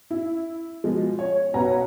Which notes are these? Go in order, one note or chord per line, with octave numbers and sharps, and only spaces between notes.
E4
B2 F3 G#3
C#5
B1 B2 B4 C#5 F#5 A#5